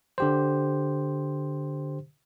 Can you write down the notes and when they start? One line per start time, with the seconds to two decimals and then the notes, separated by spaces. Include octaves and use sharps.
0.18 D3 G4 C5